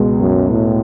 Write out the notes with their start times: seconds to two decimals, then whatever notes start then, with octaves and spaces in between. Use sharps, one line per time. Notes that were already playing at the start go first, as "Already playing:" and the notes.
Already playing: C#2 B2 G#3
0.19 F#2
0.50 A2